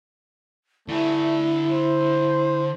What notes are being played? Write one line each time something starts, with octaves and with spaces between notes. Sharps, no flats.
D3 A3 E4 G#5
C5